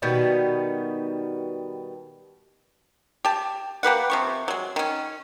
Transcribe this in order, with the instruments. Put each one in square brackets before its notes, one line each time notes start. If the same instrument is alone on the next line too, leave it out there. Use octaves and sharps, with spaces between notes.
[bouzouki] B2 D#3 G3 B3
[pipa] G4 A5
A#3 G4 B4 F#5
C3 F3 C#6
F#3 G#3
D#3 C#4